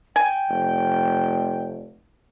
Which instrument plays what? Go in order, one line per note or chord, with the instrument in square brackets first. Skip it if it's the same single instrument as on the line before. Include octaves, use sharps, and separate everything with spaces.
[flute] G5 [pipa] G#5
[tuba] F1